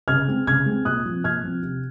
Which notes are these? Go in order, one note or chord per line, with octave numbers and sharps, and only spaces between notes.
C#3 F6 G#6
G#3 C4
C#3 F6 G#6
G#3 C4
A#2 D#6 F#6
F3 C4
A#2 F6 G#6
F3 C4
C3